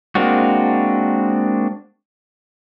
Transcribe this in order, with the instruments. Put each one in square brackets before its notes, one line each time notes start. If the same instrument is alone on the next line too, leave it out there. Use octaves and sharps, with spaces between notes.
[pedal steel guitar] G#3 A#3 C4 D4 F#4